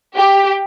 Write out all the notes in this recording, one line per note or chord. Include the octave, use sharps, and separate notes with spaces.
G4